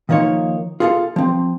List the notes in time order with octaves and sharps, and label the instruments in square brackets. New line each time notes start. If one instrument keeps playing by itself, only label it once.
[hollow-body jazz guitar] D#3 F3 A#3 D#4 C#5
F4 G#4 A4 E5 F5
F3 C4